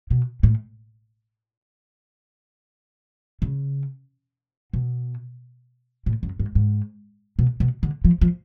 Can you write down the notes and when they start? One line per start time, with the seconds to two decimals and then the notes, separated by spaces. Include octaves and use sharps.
0.10 B2
0.43 A2
3.42 C#3
4.73 B2
6.06 A2
6.23 F#2
6.40 G#2
6.55 G#2
7.39 B2
7.60 B2
7.83 D3
8.05 F3
8.21 F3